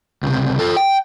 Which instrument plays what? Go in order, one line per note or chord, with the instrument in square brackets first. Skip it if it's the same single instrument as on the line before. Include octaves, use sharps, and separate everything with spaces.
[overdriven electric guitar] C#2 C3
F4 A4
G5